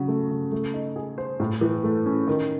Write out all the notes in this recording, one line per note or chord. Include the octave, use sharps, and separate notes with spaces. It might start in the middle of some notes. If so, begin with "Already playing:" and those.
Already playing: C#3 F#3
A3
C#3
A3
D#4
G#4
C5
A2
E3
A3
C#4
D#3